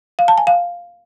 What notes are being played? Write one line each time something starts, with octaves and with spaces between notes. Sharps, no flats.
F5
A5
G#5
F5